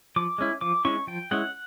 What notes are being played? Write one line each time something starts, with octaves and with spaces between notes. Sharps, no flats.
F3 D6
G#3 C#4 E4
F3 D6
G#3 C#4 E4 C#6
F3 G5
G#3 C#4 E4 F#5